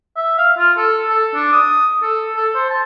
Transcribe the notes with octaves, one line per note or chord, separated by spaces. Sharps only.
E5
F5
F4
A4
A4
D4
D#6
A4
A4
C5
A5